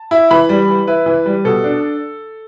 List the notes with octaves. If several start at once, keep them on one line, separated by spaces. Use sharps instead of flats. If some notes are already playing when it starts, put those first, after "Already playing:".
Already playing: A5
E4
E3 B5
G3
E3
E4 B4
E3
G3
B2 A4
D4